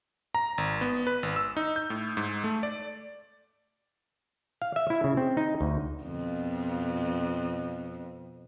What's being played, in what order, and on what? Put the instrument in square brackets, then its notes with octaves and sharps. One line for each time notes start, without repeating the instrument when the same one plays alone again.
[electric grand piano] A#5
G#1
B3
B4
G#1
E6
D#4
G6
A2
G#2
A3
D5
[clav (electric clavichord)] F5
E5
E4
C#3
C4
D#4
D2
[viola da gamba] F2 B2